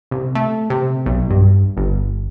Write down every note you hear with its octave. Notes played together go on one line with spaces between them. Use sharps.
C2
A3
C3
B1
G2
G1